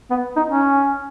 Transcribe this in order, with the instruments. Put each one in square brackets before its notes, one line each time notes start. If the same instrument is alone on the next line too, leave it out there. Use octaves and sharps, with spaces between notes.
[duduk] B3
D#4
C#4